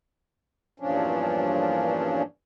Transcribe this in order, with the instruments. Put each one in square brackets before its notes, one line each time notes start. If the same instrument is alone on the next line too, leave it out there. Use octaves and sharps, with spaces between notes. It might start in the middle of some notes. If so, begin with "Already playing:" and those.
[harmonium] E2 G2 A#2 F3 C#4 D4